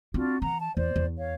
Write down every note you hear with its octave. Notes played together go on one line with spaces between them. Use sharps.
C4 D4 F4 F#4
E3 F#5 A#5
A5
E2 C5 D5
E2
C#5 F5